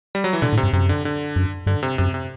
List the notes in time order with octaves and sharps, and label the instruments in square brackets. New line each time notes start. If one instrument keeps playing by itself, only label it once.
[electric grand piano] G3
F#3
E3
[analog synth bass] B2 [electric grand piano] D3
[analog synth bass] A2
[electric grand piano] C3
[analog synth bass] G2
[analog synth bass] F#2 [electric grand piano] C3
[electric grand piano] D3
D3
[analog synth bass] F#2
[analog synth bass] G2 [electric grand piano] D3
[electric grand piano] C3
[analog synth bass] F#2 [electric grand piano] C3
[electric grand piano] C3